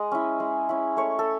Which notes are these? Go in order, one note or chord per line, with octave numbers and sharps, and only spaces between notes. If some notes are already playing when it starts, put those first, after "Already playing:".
Already playing: G#3 D#5
C#4 E4
G#3
C#4 E4
A3 C#5
A4